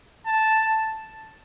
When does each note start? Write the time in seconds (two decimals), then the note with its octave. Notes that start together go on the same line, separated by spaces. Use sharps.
0.27 A5